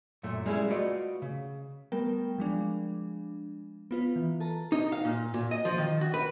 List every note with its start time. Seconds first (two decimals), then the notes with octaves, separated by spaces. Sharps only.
0.23 F#2 A#2 A3
0.46 G3 G#3 A#3 C#4 E4 G#4
0.70 A3 F4 F#4 B4 D5 D#5
1.22 C#3
1.92 G3 A3 B3 A#4 G5
2.38 F3 G#3 D4
3.91 B3 F4 B4
4.16 E3
4.40 A4 A5 A#5
4.72 D#4
4.92 F5
5.05 A#2
5.34 A#2
5.51 D#5
5.65 F3
5.78 D#3
6.01 F#4
6.14 B4